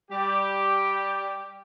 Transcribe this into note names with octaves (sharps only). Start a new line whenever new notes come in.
G3 G4